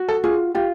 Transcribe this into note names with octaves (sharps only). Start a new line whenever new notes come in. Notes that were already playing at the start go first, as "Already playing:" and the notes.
Already playing: F#4
A4
F4 G#4
F4 G4